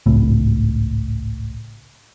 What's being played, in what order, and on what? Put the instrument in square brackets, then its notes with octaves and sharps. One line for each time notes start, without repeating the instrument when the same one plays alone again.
[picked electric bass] G#1 C#2 A2